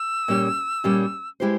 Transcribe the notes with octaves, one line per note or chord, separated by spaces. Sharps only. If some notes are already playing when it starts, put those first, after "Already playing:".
Already playing: E6
A#2 G3 C#4 G4 C#5
A#2 G3 C#4 G4 C#5
G#3 E4 G4 C5